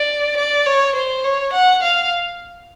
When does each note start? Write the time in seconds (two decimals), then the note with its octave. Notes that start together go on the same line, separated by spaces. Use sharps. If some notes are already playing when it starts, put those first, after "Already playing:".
Already playing: D5
0.37 D5
0.66 C#5
0.95 C5
1.24 C#5
1.53 F#5
1.82 F5